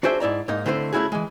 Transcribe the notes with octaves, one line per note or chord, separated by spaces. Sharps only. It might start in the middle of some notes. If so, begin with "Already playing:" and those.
D4 F#4 G#4 C5 E5
G#2 E4 D5 A#5
G#2 A#3 D#4
D3 A3 C4 E4 A4 C5
A3 C#4 E4 F#4 G#4
E3 G#3